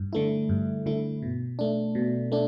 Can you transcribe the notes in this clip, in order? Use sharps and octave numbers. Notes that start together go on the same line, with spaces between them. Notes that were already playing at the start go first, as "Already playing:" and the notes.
Already playing: G2
D3 A3 E4
G2
D3 A3 E4
B2
A3 D4
B2
A3 D4